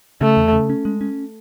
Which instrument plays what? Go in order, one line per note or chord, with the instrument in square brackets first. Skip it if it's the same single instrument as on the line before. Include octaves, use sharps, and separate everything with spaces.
[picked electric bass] C#3 [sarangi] A3
[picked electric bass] E2
C#3
C#4
G#3
C#4